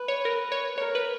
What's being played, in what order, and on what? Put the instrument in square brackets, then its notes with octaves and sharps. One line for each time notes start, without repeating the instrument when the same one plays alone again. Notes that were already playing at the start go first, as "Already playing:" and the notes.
Already playing: [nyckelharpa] B4
[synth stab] C#5
A#4
C#5
[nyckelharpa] A#4 [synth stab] C#5
[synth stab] B4